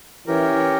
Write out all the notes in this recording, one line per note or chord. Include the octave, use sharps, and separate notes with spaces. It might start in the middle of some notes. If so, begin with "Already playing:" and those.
E3 C#4 G4 A#4